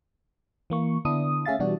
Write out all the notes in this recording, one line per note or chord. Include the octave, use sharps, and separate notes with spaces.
E3 A#3 C#6
D3 B3 D4 E4 D#6
A3 C#4 G#4 E5 F5 A6
B2 E3 G3 D4 F#4